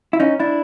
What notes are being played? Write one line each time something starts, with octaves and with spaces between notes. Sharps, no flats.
E4
C#4 D#4
D4 E4